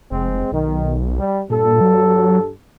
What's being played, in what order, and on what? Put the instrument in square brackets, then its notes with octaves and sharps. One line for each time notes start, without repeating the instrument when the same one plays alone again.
[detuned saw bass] F1 [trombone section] G#3 C4
[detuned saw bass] B1 [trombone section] D#3
[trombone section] G3
[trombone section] G2 A4 [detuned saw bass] A#2
[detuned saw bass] F#3